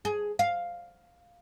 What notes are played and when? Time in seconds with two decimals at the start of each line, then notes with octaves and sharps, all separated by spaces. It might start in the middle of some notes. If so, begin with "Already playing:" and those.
0.05 G#4
0.39 F5